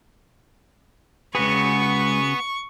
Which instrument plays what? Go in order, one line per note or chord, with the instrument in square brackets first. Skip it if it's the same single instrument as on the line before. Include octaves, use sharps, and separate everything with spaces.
[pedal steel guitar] C#3 F#4 G#4 [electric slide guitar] G#3 B4 [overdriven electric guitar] B3 [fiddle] C#6